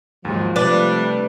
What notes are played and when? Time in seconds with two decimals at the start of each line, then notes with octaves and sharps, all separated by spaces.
0.25 D#2 G#2 F3 F#3 G#3
0.56 C3 G3 A3 D4 B4